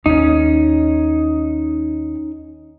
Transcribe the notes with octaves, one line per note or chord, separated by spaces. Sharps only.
D#2 C#4 D#4